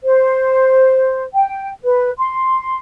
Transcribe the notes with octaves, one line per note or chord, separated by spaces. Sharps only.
C5
G5
B4
C6